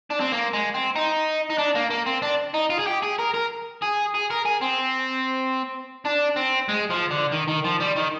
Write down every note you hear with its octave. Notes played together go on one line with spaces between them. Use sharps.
D4
C4
A#3
G#3
C4
D#4
D#4
D4
A#3
A#3
C4
D4
D#4
F4
G#4
G4
G#4
A#4
A#4
G#4
G#4
A#4
G#4
C4
D4
C4
G#3
F3
D3
D#3
D#3
F3
G3
D#3